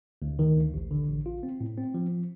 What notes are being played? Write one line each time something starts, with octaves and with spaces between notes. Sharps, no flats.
D2
D#3
D2
A1
D3
A1
F4
C4
A2
C4
F3